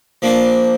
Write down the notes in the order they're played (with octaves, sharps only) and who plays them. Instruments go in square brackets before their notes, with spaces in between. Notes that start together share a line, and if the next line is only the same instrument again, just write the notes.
[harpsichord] F3 A#3 D4